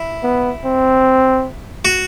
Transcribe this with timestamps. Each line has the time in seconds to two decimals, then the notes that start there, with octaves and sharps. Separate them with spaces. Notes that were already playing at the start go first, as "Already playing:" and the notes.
Already playing: E4
0.23 B3
0.65 C4
1.85 F#4